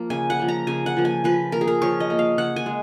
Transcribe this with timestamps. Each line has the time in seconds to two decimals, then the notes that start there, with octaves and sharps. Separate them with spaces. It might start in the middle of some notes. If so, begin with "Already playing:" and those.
Already playing: F3 A#3
0.10 C#3 G#5
0.30 F#5
0.39 F3 A#3
0.48 A#5
0.67 C#3 G#5
0.86 F#5
0.96 F3 A#3
1.05 G#5
1.24 F3 B4
1.52 A#3 A#4
1.61 G#4
1.68 A#4
1.82 F3 C#5
2.00 D#5
2.10 A#3
2.19 F5
2.38 C#3 F#5
2.56 G#5
2.66 G#3